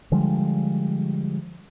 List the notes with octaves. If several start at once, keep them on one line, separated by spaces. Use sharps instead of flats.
D3 F3 G3 G#3